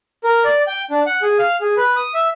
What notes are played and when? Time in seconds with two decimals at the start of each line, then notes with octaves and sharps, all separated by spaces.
0.24 A#4
0.44 D5
0.67 G5
0.91 D4
1.06 F#5
1.22 G#4
1.39 F5
1.61 G#4
1.77 B4
1.96 D#6
2.14 E5